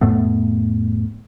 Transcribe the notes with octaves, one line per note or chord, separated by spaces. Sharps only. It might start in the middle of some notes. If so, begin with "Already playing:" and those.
F2 A2 A3 B3